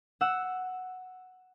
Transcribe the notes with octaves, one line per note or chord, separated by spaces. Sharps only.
F#5 E6